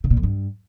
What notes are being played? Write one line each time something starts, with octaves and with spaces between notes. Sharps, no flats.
C#3
A#2
F2
G2